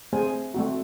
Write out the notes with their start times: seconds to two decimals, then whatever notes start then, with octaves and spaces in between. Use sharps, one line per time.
0.13 A3 C4 G#4 C5 G#5
0.54 A3 C4 F#4